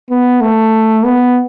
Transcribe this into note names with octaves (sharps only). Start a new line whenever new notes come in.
B3
A3
B3